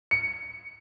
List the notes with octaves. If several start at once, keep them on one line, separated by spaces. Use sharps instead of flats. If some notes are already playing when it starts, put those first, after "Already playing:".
C#7